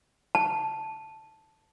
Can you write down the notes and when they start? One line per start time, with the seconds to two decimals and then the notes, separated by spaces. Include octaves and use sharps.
0.35 A5